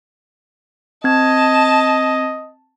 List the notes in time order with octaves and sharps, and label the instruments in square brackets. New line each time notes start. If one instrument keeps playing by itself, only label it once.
[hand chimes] C4 G#6 [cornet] D#5 [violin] A5